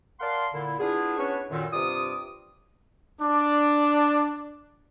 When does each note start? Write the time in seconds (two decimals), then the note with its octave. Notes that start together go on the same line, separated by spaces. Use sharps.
0.20 A#4 D5 F5 F#5 A5 C6
0.53 A#2 D3 E4
0.79 B3 D4 E4 F4 G#4
1.18 B3 C#4 D4 B4 C#5
1.51 F#2 A#2 D3 D#3
1.72 G2 C3 F4 D6 D#6
3.20 D4 D5